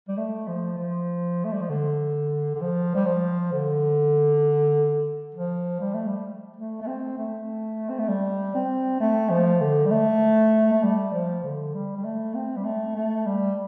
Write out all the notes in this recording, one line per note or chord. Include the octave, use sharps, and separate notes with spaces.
G3
A3
F3
F3
A3
G3
F3
D3
D3
F3
G3
F3
D3
F3
G3
A3
G3
A3
A3
C4
A3
C4
A3
G3
C4
A3
F3
D3
G3
A3
A3
G3
F3
D3
G3
G3
A3
C4
G3
A3
A3
G3